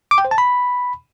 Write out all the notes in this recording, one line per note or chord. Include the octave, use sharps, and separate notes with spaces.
D6
G5
C5
A5
B5